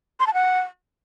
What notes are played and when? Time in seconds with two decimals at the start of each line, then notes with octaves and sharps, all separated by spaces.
0.20 C6
0.27 A5
0.34 F#5